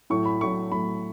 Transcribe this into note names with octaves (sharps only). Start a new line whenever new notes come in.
A2 F#3 A3 C#6
B5
A2 F#3 A3 C#6
A2 F#3 A3 B5